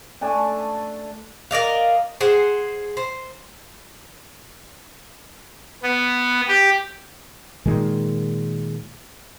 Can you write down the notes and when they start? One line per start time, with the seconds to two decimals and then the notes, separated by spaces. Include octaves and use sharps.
0.21 A3 D4 G#5 A5
1.51 A#4 D5 D#5 F5
2.21 G#4 C5 F#5
2.97 C5
5.83 B3
6.48 G4
7.66 A#2 D#3 G#3